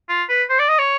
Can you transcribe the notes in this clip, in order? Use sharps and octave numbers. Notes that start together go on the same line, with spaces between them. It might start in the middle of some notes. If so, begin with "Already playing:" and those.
F4
B4
C5
D5
D#5
C#5